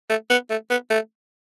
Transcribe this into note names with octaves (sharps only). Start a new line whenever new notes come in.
A3
B3
A3
B3
A3